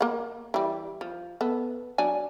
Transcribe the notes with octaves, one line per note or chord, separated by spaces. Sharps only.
A#3 F#5
E3 G3
F3
B3 A4
F#3 D4 G#5